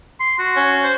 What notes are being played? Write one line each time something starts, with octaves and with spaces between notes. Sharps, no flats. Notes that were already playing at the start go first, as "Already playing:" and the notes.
C6
F#4
C#4
C5